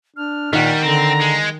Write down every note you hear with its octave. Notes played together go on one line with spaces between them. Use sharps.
D4 F6
A#2 D#3 G3 F#5
D3 C4 A#5
G#3